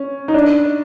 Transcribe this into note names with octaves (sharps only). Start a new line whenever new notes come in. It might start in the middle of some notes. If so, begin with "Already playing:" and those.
Already playing: C#4
D#4
D4